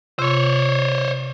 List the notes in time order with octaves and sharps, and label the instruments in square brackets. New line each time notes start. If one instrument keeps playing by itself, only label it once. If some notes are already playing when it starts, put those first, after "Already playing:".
[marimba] C3 F4 C6 [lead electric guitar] C5 C#5